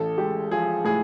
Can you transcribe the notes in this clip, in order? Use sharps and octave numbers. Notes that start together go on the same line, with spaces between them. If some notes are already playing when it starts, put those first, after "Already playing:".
Already playing: A1 A4
G#3 G4
F3 G#4
A2 G#4